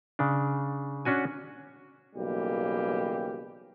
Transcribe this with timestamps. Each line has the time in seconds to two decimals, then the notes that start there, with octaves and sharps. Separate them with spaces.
0.19 C#3 D4
1.05 C#4 D4 F#4 G#5
2.16 B1 C#3 E3 G3 A#3 G4